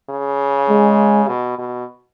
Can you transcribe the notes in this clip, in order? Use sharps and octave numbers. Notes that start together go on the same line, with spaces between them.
C#3
G#3
B2
B2